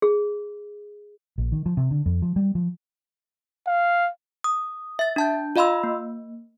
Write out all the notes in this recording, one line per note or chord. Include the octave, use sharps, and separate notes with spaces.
G#4
A#1
D#3
F3
C3
D3
F2
F3
G3
F3
F5
D#6
E5 A6
D4 A5 G6
F4 D#5 F5 B5 C6 E6
A#3